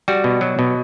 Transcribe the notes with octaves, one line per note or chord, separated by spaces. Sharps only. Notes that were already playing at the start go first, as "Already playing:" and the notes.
G3 F#4
B2
F#3
B2